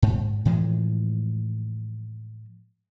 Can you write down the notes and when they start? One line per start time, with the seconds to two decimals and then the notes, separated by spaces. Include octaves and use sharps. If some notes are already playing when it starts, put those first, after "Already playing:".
0.02 G#2
0.45 A2 E3 F3 G#3